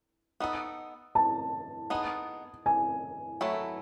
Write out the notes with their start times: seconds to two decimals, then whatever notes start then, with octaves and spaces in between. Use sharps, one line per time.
0.40 B3 D#4 A4
1.15 A5
1.90 B3 D#4 G#4
2.66 G#5
3.41 F#3 A3 E4 A4